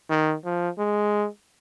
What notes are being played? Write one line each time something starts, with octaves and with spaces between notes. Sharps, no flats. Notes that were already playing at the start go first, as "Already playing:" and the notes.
D#3
F3
G#3